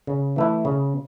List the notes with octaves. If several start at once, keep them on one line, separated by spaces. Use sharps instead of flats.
C#3
E3 A3 E4
C#3